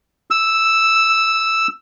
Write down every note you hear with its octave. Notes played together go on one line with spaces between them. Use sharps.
E6